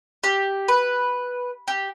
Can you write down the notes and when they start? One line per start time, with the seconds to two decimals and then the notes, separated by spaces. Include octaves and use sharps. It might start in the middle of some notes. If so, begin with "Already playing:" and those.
0.24 G4
0.68 B4
1.68 G4